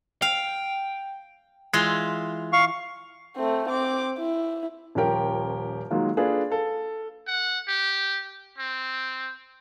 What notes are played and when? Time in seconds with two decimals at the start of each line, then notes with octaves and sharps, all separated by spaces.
0.22 F5 G5
1.74 E3 G#3 F4 C6
2.53 F5 C#6
3.36 A3 C4
3.68 C4 D6
4.18 E4
4.95 D#1 F3 C#4 G4 A#4 G5
5.91 D#3 F#3 G#3 A#3 F4
6.17 A#3 D4 F4 G#4 A4 B4
6.50 A4 F5
7.27 F#5
7.68 G4
8.58 C4